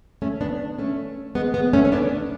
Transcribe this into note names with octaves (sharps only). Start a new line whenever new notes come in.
A3 C#4
B3 D4
A3 C#4
G#3 B3
G#3 B3
A3 C#4
C#4
B3 D4